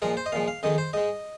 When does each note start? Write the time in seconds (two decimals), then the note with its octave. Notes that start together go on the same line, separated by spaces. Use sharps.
0.02 A#2 F3 G#3 A#4
0.17 C5
0.26 D#5
0.32 A#2 F3 G#3 F5
0.48 F5
0.63 F2 D#3 G#3 D#5
0.78 C5
0.93 G#2 G#3 D#5